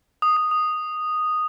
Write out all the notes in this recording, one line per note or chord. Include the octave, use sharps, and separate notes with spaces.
D#6
D#6
D#6